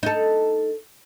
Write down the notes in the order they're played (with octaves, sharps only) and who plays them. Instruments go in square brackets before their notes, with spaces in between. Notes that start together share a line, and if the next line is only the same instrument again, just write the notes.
[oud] D#4 A4